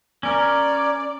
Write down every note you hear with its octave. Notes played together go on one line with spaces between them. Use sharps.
C#4 A#4 D5